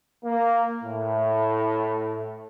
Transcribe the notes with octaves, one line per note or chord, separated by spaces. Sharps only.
A#3
A2